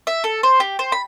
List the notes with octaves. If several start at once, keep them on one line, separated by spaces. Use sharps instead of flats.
E5
A4
C5
G4
C5
B5